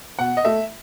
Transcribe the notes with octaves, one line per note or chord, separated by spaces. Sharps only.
B2 F#5
D#5
A3 E5